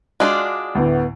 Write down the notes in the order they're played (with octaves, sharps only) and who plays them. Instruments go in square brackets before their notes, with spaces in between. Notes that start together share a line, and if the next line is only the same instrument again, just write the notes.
[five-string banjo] G#3 D4 F4 [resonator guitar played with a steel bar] F#4 D5
[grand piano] D2 A2 [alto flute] B3